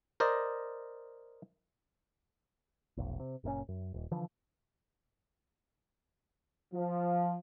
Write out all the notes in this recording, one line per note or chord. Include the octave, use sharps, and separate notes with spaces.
A#4 C5 D5 D#5
F1 B1
C3
F#1 A#2 D3 C#4
F#2
D#1
D3 E3 F3
F3